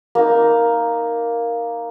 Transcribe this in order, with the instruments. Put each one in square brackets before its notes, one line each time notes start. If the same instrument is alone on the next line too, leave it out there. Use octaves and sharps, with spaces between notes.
[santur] A#3 D#4